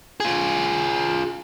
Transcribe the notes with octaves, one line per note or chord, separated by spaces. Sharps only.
F4 G#4